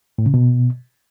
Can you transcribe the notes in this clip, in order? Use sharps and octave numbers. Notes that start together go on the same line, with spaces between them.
A2
C#3
B2